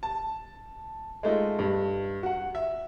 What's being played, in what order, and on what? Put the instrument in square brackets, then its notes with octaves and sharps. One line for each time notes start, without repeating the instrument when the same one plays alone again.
[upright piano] A5
G#3 A3 D#4 F4
G2
F#4 F#5
E5